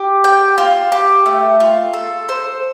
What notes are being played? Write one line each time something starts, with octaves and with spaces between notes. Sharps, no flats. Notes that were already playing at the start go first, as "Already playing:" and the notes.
Already playing: G4
G5
F4
G4
A3
F4
A4
C5